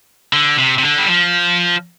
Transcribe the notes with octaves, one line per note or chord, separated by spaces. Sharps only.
D3
C3
C3
D3
G3
F3